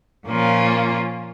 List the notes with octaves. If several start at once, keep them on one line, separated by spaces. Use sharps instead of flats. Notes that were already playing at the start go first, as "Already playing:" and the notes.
A#2 F3 A#3 C#4 F4